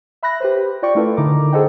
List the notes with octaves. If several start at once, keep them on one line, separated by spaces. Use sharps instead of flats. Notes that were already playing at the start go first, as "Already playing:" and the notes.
E5 B5 F#6 A#6
G4 B4 C5
F4 D5 G5 C#6
A3 C#4 E4 F4 A4 B4
D3 D#4 E4 A#4 A#5 D6
G#4 A4 C5 D#5 F#5 G5